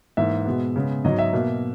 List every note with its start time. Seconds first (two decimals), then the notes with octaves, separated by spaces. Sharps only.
0.17 G#2 E3 A#3 E5
0.46 B2 G#3 B3
0.76 C#3 G#3 B3
1.04 G#2 F#3 B3 D#5
1.19 E5
1.33 B2 A#3